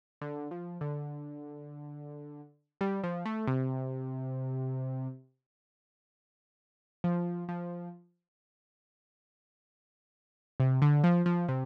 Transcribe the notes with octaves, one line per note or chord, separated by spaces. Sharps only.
D3
F3
D3
G3
F3
A3
C3
F3
F3
C3
D3
F3
F3
C3